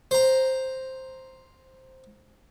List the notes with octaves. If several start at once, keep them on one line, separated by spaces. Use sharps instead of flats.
C5 A#5